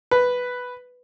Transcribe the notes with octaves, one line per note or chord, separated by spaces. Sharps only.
B4